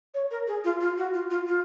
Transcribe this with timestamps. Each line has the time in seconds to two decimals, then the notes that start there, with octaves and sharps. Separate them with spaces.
0.14 C#5
0.31 A#4
0.47 G#4
0.64 F4
0.80 F4
0.97 F#4
1.13 F4
1.30 F4
1.46 F4